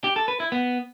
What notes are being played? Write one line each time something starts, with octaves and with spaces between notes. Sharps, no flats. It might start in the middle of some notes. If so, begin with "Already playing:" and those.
G4
A4
B4
E4
B3